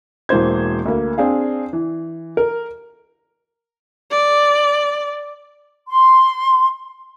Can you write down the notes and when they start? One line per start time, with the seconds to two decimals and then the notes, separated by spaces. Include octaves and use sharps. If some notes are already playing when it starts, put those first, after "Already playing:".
0.29 E1 E3 A#3 C5 G#6
0.85 D2 A#3
1.18 C4 D4 G#4 F5
1.73 E3
2.37 A#4
4.11 D5
5.88 C6